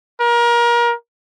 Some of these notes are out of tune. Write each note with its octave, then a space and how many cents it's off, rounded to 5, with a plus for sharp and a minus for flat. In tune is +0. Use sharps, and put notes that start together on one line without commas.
A#4 +30